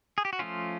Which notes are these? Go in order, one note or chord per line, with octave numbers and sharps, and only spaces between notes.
G#4
G4
F#4
F3 A3 C#4 F4